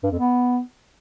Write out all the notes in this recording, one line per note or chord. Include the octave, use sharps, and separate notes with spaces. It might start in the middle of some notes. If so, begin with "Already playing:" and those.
G2
F2
B3